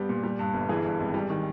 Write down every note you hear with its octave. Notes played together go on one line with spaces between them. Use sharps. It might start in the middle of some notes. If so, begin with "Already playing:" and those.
Already playing: G2 G3 B3 G4
A#2
G3
G2
G1
E3 G#4
G2
G#1
G3
D#3